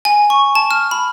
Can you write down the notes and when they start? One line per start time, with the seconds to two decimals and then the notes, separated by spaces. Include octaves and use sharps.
0.05 G#5
0.30 C#6
0.55 A5
0.71 F6
0.91 B5